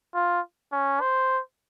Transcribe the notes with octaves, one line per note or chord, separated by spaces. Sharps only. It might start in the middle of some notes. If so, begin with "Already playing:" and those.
F4
C#4
C5